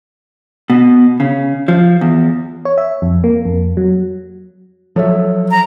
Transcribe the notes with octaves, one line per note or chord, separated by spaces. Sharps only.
B2
C#3
F3
E2
C#5
E5
F2
A#3
F2
F#3
F3 F#3 A4 C#5 E5
A#5